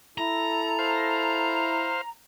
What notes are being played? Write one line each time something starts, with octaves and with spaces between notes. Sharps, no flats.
E4 A4 A#5
C5 F5